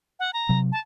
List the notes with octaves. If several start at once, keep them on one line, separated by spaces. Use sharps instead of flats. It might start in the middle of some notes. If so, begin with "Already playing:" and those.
F#5
A#5
C3 F#3
A5